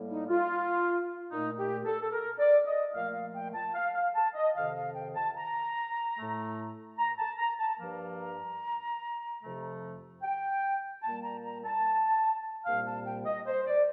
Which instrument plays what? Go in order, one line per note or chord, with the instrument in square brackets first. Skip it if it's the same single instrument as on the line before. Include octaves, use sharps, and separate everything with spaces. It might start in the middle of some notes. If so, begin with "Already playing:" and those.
Already playing: [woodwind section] A2 G3 A#3
D#4
F4
A#2 A3 D#4
G4
A4
A4
A#4
D5
D#5
A#2 F3 A3 F5
F5
G5
A5
F5
F5
A5
D#5
F2 C3 D#3 F5
F5
G5
A5
A#5
A2 A3
A#5
A5
A#5
A5
G2 F3 A#3
A#5
F2 C3 F3 A3
G5
A#2 G3 A#3 A5
A#5
A#5
A5
C2 A#2 G3 A#3 F5
A5
G5
D#5
C5
D5